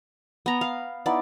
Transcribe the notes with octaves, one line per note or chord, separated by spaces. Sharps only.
B3 A#5
F5
B3 D#4 E4 D5